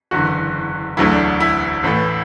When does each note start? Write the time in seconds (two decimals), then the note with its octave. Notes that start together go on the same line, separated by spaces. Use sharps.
0.11 F#1 E2 D3 F#4
0.97 E1 D2 D3 F#3 A3 E4
1.12 D4
1.40 E4
1.83 A1 A2 E3 A3